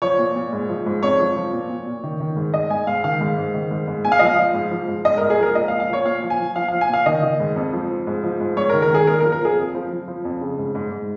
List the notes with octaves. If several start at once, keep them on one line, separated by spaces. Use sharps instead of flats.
F3 C#5
A#2
A#2
G#2
F3
G#2
F2 C#5
F3
F3
A#2
A#2
A#2
D#3
D#3
G#2
G#2 D#5
G#2 G#5
G#2 F5
D#3 F5
G#2
G#2
D#3
G#2
G#2
A#2 G#5
F5
F3 D#5
F5
F3
G#2
F3
G#2
G#2 D#5
G#2 A#4
G#4
F3 A#4
A#2 D#5
F5
A#2
F5
F3 C#5
A#2 F5
F3
G#5
F3
F3 F5
F3 F5
G#5
A#2 F5
D#3 D#5
D#3
G#2
F2
F3
F3
G#2
F3
G#2
G#2 C#5
A#4
D#3
A#4
D#3 G#4
A#2 A#4
A#4
F3
A#4
F3 G#4
F2
F3
F3
F3
F2
C#3
G#2
G#2
G#2